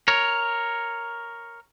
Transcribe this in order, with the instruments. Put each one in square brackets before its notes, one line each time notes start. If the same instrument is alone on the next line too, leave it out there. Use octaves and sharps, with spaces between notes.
[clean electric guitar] A#4 C#5